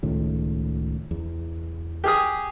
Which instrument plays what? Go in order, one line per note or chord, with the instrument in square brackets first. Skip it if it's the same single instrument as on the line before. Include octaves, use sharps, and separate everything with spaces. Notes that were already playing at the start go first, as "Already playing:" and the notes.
[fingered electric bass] C#2 A2 D#3
E2
[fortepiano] G4 G#4 D#6